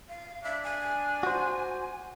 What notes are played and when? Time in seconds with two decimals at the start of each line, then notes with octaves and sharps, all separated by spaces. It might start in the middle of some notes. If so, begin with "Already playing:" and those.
0.09 F5
0.44 D4 E5
0.64 G#5
1.23 F#4 C5